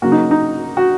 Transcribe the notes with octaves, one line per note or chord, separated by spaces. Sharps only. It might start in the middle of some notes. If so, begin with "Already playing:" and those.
C#3 F#3 A#3 F#4
D#4
D#4
F#4